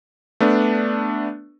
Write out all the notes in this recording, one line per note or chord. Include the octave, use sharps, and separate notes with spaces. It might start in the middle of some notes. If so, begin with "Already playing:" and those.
A3 B3 D4